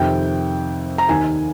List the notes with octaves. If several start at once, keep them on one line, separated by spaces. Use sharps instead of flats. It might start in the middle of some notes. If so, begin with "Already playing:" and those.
Already playing: F2 C3 D#3 G5
A#5
D#2 D#3 G#5